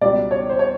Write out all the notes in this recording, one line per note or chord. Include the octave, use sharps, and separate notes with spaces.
C#2 B2 G3 D5
C#5
C5
C#5